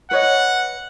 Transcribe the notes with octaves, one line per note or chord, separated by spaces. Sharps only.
B4 C#5 D#5 F#5